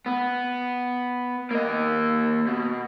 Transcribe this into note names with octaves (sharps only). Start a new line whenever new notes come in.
B3
A#3 D#5
B2